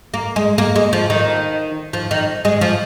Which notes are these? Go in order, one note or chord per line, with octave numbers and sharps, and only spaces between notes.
A#3
G#3
A#3
G#3
F3
D#3
F3
D#3
G#3
F3